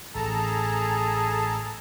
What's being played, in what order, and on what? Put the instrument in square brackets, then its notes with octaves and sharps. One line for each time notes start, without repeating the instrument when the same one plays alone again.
[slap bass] A1 [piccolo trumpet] G#4 [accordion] A4 A5 A#5